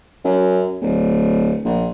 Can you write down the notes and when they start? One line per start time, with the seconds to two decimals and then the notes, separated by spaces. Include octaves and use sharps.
0.25 F#2
0.81 D1
1.65 A#1